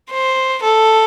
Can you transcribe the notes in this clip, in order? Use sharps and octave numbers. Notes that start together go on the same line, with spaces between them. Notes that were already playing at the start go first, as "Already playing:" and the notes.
C5
A4